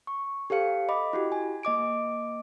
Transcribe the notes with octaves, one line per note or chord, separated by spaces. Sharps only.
C#6
G4 A4 C5 F5 C#7
D#5 B5 D6
E4 F#4 G4
G#5
A#3 D#5 D6 D7